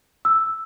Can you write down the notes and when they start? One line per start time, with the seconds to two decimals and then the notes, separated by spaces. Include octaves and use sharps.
0.25 E6